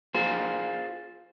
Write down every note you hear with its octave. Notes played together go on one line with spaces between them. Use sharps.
F4 G#4 C5